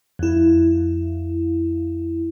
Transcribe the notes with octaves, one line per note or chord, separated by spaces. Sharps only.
F2 E4